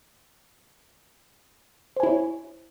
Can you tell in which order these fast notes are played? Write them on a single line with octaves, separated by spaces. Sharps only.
C5 G#5 E4 C#5